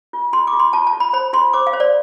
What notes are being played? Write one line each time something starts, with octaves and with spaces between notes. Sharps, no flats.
F4
F4 C6
D6
F4
C6
F4 A5
A5
F4
B5
C5 B5
F4 C6
C5 D6
F5
C5
D5